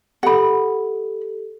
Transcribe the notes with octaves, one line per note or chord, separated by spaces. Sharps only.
G4 A4 F#5 B5